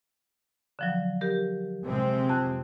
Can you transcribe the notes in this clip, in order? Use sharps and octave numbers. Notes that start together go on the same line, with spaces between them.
D3 F3 F#3
G4 A#4
C3 G#3 C4
F2 F#6